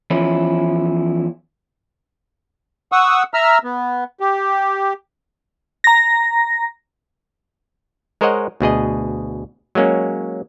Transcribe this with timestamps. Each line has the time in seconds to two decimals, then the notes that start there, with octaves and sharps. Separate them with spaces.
0.10 E2 F3 C#4 E4
2.92 F#5 C#6 D#6 E6
3.34 E5 A#5 E6 F6
3.64 B3
4.20 G4
5.84 A#5 A#6
8.21 G#3 A#4 C5 C#5 D#5 F#5
8.61 D2 B2 G#4 D#5
9.75 F#3 G#3 A#3 C#4